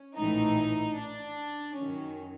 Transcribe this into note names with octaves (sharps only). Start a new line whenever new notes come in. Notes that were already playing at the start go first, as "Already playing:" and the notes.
Already playing: C#4
A#1 A2 E3 D#4
D4
F#2 D#3 F#3 C#4